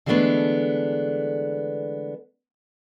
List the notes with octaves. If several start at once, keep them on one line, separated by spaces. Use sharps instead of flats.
D3 E3 G#3 A3 B3 D4